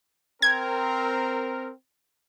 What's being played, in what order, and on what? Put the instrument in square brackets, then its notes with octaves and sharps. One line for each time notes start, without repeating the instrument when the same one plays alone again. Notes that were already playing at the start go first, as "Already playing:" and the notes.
[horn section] C4 A#4 [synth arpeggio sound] G#6